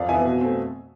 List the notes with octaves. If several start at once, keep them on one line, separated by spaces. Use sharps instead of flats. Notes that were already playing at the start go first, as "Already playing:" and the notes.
Already playing: F2 D5 F5
E3 B3 E5 G#5
B2
A3 C4